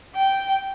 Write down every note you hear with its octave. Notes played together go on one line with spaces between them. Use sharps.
G5